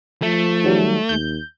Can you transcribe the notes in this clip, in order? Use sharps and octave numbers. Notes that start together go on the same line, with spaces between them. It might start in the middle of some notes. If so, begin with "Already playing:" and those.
F3 A3
D#3 F#3 G3
D#2 G6